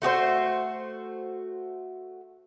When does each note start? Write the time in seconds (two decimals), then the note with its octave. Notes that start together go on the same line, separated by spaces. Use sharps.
0.02 A3 F#4 G4 C5